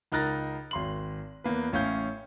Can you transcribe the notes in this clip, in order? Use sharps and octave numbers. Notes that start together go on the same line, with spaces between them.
C#2 D#4 A#4 F#6 A6 A#6
G#1 C6 F#7
E2 A#3 B4
A1 C#4 F5 G6